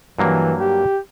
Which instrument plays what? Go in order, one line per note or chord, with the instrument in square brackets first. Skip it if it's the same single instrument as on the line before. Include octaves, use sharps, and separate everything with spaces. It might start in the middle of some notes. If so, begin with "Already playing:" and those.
[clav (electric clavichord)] G2 F#3 A#3 [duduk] E3
[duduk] G4